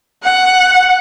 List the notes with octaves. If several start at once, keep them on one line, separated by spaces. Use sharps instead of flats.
F#5